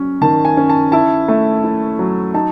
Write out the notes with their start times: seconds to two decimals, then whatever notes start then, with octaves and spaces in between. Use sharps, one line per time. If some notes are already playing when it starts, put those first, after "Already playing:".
Already playing: F#3 C#4
0.21 D#3 A5
0.45 G#5
0.57 C#4
0.69 A5
0.92 E4 A5
1.28 A3
1.64 E4
1.99 F#3
2.34 D#4 A5